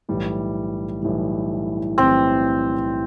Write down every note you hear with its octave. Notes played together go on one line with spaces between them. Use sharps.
B1 A2 E3 G3
B1 A2 E3 G3
B1 A2 E3 G3 C4